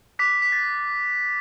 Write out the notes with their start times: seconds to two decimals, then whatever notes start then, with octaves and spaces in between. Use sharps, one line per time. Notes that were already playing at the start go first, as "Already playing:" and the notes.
0.19 D6 F#6 B6
0.42 B6
0.52 A6